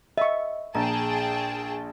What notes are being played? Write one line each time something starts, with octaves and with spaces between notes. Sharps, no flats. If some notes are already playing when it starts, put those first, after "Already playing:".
D#5 E5 C#6
A#1 G#4 G5 A5 A#5